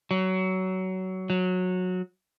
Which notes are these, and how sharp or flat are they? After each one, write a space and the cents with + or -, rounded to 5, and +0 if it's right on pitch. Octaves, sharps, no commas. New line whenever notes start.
F#3 +20
F#3 -15